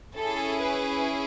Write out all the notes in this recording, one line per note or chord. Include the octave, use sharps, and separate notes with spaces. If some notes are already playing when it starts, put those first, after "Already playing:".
C#4 E4 G#4 A4
B4